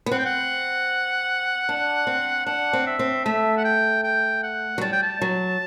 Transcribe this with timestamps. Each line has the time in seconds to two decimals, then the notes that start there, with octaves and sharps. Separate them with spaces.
0.06 B3
0.11 C4 F#5
0.19 G5
0.25 F#5
1.69 D4
2.07 C4
2.46 D4 F#5
2.73 C4
2.86 E5
2.99 C4
3.25 A3 E5
3.57 F#5
3.64 G5
4.03 G5
4.43 F#5
4.78 F#3
4.81 G3 A5
4.92 G5
5.02 A5
5.22 F#3